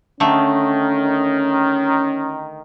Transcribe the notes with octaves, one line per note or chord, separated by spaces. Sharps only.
D3 D#3 A3 C#4